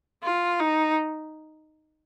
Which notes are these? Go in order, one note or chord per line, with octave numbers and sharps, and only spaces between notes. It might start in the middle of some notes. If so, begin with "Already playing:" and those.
F4
D#4